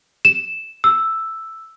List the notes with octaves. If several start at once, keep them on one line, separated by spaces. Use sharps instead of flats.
E7
E6